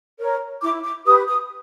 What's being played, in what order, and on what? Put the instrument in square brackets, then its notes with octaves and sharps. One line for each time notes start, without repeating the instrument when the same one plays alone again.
[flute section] A#4 C#5
E4 D6
D6
G4 B4 D#6
D#6